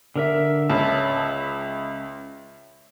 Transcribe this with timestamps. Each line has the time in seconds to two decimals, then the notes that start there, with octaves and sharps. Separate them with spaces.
0.16 D3 A#4 E5
0.70 C#2 C#5 E5 A5